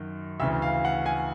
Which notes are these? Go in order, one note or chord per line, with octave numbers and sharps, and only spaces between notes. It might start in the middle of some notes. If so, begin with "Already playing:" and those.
Already playing: F#2 D#3
D2 C#3 E3 E5
F5
F#5
G#5